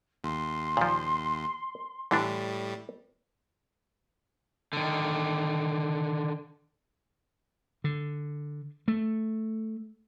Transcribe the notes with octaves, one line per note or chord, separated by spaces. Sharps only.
D#2 C6
A#2 F3
A2 D3 E3 G3 D4
D3 D#3
D3
A3